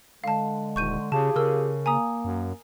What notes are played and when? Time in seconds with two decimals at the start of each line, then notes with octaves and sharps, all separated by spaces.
0.24 D3 G#3 F5 A5
0.76 D#1 C#6 G6 D#7
1.12 C#3 F4 G4 G#4 A5
1.36 C#3 A#4 E6
1.86 A#3 G#5 A#5 D#6
2.25 F#2